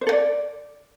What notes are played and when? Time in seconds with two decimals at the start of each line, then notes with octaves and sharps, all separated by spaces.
0.01 C5
0.07 A4
0.12 D5